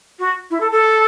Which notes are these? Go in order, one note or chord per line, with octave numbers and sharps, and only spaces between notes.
F#4
E4
A4
A4